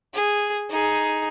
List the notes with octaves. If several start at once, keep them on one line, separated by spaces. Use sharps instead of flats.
G#4
D#4 G#4